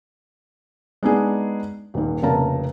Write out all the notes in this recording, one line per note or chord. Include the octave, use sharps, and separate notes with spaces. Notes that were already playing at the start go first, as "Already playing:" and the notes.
G#3 B3 D4 D#4 G#4
D#1 G#2
F1 A#1 C#3 A#4 A5 A#5